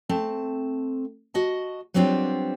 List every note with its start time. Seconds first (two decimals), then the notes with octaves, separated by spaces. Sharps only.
0.09 A3 C4 A5
1.34 F#4 D#5 A5
1.94 F#3 G3 B3 C4 D4 F4